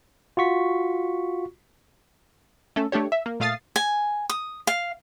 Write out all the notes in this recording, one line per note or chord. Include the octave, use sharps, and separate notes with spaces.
F4 F#4 C#6 B6
A3 C#4 A4
A3 D4 G4 C#5
E5
A#3
A#2 A3 F5 D#6 A6 C7
G#5
D#6
F5